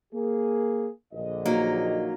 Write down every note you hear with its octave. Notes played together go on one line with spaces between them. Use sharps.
A#3 G#4
A#1 D3 D#5
F#3 A#3 D#4